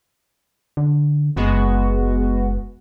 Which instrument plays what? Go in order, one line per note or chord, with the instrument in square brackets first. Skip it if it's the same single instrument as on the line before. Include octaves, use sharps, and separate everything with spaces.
[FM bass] D3
[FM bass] F#1 [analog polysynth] G#3 B3 F#4